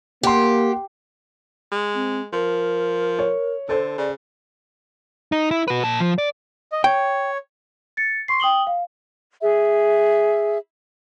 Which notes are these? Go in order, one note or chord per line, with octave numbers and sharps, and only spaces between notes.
A#3 G4 F#5 C6
G#3
C4
F3 A#4
C#5
D3 A4 C5
C#3 D5
D#4
E4
F#4 B4
A#2 A5
F3
D5
D#5
C#5 G5
A6 C#7
C6 C#6 C7
G5 D#6 F#7 G7
F5
G#4 E5